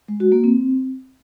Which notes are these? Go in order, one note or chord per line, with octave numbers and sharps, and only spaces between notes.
G#3
F#4
A#3
C4